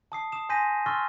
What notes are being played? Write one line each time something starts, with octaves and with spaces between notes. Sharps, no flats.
A5 D#6 C7
D#6 E7
G#5 C6 G6 A#6 B6 D#7
C6 C#6 E6 F6 A6